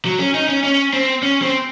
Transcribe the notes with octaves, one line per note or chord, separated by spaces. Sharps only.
F#3
C#4
D#4
C#4
C#4
C4
C#4
C4